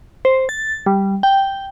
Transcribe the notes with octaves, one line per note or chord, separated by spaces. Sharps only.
C5
A6
G3
G5